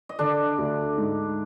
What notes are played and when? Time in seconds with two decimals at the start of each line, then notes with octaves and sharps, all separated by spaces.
0.09 D#5
0.19 D3 D4 D5
0.58 D2
0.98 G#2